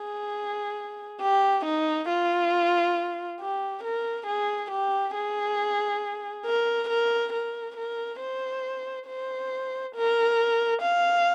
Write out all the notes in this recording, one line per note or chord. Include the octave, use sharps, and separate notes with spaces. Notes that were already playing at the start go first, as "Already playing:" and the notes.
Already playing: G#4
G4
D#4
F4
G4
A#4
G#4
G4
G#4
A#4
A#4
A#4
A#4
C5
C5
A#4
F5